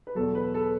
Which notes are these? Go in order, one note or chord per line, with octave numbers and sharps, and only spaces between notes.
B4
E2 B2 F#3 A4
B4
A4